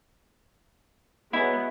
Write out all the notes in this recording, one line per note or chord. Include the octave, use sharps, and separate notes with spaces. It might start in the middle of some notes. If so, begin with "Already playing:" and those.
F#3 B3 E4 G#4 D#5